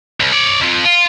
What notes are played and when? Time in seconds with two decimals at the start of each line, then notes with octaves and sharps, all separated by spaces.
0.20 C2
0.32 C#5 D5
0.61 F2 F3
0.85 F4